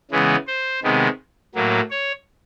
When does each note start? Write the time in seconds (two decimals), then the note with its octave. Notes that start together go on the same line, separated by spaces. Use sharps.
0.11 C#3 E3 G#3 B3
0.47 C5
0.83 C3 D#3 G#3 B3
1.55 A2 F#3 A#3
1.91 C#5